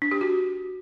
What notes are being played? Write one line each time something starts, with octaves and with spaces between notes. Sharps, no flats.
D4
G4
F#4